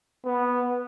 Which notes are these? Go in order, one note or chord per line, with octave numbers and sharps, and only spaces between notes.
B3